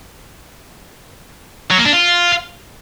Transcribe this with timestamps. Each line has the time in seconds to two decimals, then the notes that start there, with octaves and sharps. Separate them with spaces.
1.71 F#3
1.78 A#3
1.86 D4
1.93 F4